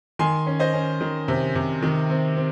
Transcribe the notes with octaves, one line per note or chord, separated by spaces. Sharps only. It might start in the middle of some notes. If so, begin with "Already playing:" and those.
D#3 G#5 C6
C#4
C5 D#5
C#4
D#3
C3
C3
D#3
C4
C4